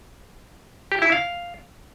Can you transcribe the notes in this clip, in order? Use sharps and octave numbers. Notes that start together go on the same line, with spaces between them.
G4
E4
F5